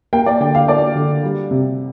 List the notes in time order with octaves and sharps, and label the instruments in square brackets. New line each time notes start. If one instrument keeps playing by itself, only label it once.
[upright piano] A#3 G5
D5
D3 G5
F5
A#3 D5
D3
G3
C3